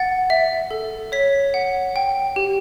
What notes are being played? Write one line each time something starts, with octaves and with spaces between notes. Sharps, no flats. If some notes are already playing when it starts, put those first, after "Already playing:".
Already playing: F#5 A6
E5
A4
C#5 B6
F#5
G5
G4